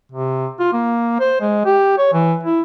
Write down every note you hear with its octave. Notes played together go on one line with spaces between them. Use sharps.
C3
F4
A#3
C5
G#3
G4
C#5
E3
E4